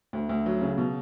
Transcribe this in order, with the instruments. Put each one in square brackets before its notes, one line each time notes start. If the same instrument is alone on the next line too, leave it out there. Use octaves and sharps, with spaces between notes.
[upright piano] D2
D2
F#3
C#3
B2